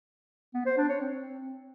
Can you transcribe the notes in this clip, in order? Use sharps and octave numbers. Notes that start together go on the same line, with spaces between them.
B3
C5
D4
C#5
C4